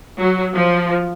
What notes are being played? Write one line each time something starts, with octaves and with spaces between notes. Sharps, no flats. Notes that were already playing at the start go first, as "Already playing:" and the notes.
F#3
F3